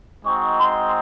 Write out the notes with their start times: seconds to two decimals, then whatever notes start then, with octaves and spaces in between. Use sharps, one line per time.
0.24 G#3 C4 D#4 F#4 C#6
0.58 C6